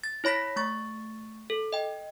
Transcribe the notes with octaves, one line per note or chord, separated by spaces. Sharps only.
A6
E4 C#5 B5 A#6 B6
A3 C#6 A6
A4
D#5 G5